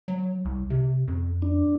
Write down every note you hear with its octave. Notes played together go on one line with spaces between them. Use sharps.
F#3
C2
C3
F2
D4